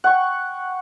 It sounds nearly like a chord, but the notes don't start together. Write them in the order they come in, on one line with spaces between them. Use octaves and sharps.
F#5 C#6 G5